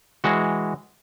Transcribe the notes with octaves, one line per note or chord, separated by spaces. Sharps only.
E3 G#3 F#4